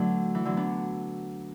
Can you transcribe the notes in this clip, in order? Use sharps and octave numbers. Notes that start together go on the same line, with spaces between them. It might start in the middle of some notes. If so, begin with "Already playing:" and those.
Already playing: D3 F#3 A3 B3
E3
D3 F#3
B3 D4